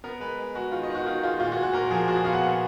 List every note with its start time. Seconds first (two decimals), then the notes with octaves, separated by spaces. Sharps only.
0.04 B3 A#4
0.20 G#3 B4
0.38 G#3
0.55 G#3 F#4
0.72 D#3 F4
0.83 D#5
0.89 D#3
0.95 F#4
1.06 D#3 F4
1.23 G#3 F4
1.40 A#2 F4
1.52 F#4
1.57 A#2
1.63 F#4
1.73 A#2 A#4
1.91 F3 G#4
2.08 A#2 F#4
2.16 G#4
2.24 B3 F5
2.33 F#5
2.42 A#2